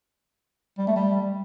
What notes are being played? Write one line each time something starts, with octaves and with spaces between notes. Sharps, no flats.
G3
A3
G3